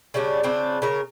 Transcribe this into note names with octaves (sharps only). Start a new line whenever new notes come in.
C#3 G3 C#4 D4
C#3 C4 D4 F4
C#3 A#4 A#5